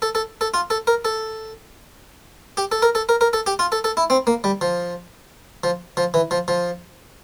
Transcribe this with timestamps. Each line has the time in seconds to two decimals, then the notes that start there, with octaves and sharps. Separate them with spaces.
0.02 A4
0.15 A4
0.41 A4
0.54 F4
0.70 A4
0.87 A#4
1.05 A4
2.57 G4
2.72 A4
2.82 A#4
2.95 A4
3.09 A#4
3.21 A#4
3.33 A4
3.46 G4
3.59 F4
3.72 A4
3.84 A4
3.97 E4
4.10 C4
4.27 A#3
4.44 G3
4.61 F3
5.64 F3
5.97 F3
6.14 E3
6.31 F3
6.48 F3